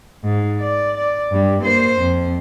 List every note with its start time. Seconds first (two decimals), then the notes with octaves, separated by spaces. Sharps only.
0.24 G#2
0.60 D5
0.98 D5
1.31 G2 G3
1.63 A#3 C5
1.99 F2